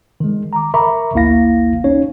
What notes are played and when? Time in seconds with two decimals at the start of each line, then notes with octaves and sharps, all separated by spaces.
0.20 D#3 G#3
0.53 A#5 D6
0.74 A#4 E5 A#5 B5 C#6 D6
1.14 G#1 D2 A#3 E4 F5 A#6
1.84 C#4 D#4 C#5